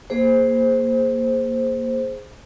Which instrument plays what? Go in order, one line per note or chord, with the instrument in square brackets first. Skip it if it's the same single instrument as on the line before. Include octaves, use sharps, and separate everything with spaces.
[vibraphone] A#3 G#4 C5